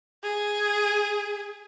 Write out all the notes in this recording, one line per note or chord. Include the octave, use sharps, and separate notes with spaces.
G#4